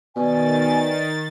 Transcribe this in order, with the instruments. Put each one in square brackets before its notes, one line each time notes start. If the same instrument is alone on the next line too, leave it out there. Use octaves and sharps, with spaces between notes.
[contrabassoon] B2 [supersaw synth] D#3 A6 [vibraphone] B4 D5 [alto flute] G#5